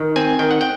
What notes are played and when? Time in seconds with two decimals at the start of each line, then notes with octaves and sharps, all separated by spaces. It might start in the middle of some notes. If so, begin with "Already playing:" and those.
Already playing: D#3
0.16 C4 G#5
0.39 D#3 G5
0.51 F#5
0.61 G5